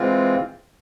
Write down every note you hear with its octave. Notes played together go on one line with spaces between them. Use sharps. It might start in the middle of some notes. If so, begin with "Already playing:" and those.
Already playing: E3 G#3 C4 F4